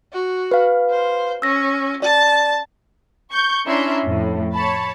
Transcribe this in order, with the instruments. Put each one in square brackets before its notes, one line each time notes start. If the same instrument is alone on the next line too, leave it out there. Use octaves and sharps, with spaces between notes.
[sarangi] F#4
[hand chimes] B4 F5
[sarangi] C5
[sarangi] C#4 [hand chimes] E6 A#6
[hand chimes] D5 [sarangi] A5
[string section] C#6 G6
C#4 D4 E4 E5 A#5 C6
F2 A2
C#5 A5 B5